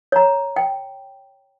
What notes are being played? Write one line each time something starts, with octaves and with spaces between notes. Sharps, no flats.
C#5 A#5
G5